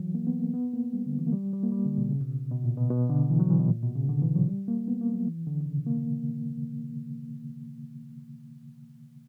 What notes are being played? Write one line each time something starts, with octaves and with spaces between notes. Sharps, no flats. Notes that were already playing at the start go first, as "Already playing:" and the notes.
Already playing: E3 F#3
A#3
B3
A#3
B3
A#3
G3
D3
E3
A#3
G3
G3
A#3
G3
D3
B2
C#3
B2
B2
A#2
B2
B2
D3
E3
F#3
E3
B2
A#2
B2
C#3
D3
E3
F#3
G3
A#3
B3
A#3
F#3
E3
D3
D3
C#3
B2
A#3